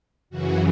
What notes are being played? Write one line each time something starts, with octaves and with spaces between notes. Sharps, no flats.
F#2 C#3 E3 F#4